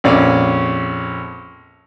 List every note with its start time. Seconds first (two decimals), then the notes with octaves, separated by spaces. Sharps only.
0.04 A#1 F2 C#4 D5